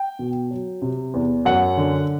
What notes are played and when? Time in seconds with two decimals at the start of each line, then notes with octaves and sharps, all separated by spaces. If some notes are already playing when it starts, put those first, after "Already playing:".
Already playing: G5
0.19 B2
0.51 F#3
0.82 C3
1.14 E2
1.45 F#2 F#5
1.77 D3